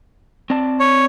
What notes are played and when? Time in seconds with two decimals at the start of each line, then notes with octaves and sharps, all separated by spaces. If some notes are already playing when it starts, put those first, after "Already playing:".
0.50 C4 D5 A5
0.80 C#5